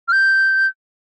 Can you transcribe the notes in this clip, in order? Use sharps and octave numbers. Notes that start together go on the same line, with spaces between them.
F6
G6